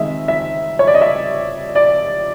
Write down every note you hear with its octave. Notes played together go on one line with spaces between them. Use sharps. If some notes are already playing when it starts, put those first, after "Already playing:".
Already playing: D#3 G#3 C4 D#4 D#5 E5
E5
C#5
D5
D#5
E5
D5